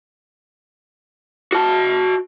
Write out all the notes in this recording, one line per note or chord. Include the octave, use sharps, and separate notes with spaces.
F#4 A5